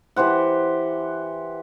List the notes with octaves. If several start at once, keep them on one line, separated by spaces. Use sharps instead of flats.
E3 G4 C5 F#5